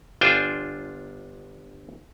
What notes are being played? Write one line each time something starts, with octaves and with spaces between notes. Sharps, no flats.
G1 D4 F4 C5 G5 G#5